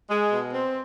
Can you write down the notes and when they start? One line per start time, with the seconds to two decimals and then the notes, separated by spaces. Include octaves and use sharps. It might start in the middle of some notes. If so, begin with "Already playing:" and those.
0.09 G#3
0.31 B2
0.53 C4